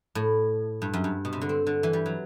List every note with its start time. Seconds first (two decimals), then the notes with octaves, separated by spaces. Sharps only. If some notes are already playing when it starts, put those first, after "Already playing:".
0.15 A2
0.82 G2
0.93 F#2
1.04 G2
1.25 B2
1.33 C3
1.41 D3
1.49 C4
1.67 D3
1.83 E3
1.93 G3
2.06 F#3